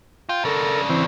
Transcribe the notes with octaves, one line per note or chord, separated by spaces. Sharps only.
F4 G5
C#3 D4 A4 A#4
E3 C4